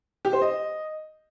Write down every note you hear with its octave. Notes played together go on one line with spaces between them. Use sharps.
G4
C5
D#5